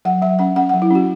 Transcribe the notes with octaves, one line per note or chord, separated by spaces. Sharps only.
F#3 F#5
F#3 E5
C#4 F#5
C#4 F#5
F#5
F#3
E4
C#4 F#4